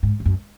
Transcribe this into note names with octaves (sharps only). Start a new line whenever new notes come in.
G#2
F2
F#2